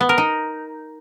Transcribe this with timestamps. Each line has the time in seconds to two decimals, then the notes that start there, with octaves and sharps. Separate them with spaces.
0.01 B3
0.09 A#4
0.18 D#4